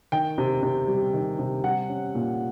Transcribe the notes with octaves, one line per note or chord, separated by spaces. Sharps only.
D#3 G5
C3
C3
G3
D#3
C3
G3 F#5
C#4
A#2